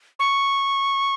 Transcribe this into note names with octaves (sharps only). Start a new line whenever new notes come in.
C#6